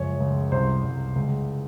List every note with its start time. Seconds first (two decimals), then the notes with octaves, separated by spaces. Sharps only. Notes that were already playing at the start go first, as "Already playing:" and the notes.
Already playing: C#2 F#2 F3 C#5
0.20 C#2
0.52 C2 C5
0.84 C2
1.16 C#2